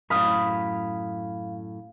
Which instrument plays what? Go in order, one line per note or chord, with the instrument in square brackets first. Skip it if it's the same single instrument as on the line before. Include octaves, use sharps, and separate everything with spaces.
[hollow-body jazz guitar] F#2 A2 [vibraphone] F5 [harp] B5 D#6 F6